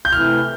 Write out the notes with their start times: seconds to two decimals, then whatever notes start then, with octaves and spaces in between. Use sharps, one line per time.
0.05 G6
0.13 C3 E3 A3 E4 F6